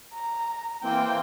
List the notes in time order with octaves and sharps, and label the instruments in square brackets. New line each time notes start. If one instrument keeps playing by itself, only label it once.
[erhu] A#5
[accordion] E3 A#3 C4 [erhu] G5